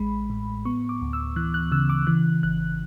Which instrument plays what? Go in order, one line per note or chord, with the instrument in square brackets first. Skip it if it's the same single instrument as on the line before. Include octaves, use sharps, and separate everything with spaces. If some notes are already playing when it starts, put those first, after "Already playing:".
Already playing: [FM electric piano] A1 G#3 B5
A2
B3 C#6
D6
D2
E6
E3 F#6
F#6
C#3 E6
D6
E3 F#6
G#1 F#6